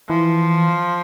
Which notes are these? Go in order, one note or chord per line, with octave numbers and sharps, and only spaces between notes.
E3 F3